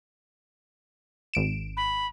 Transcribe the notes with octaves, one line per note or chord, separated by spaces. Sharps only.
G#1 D7 E7
B5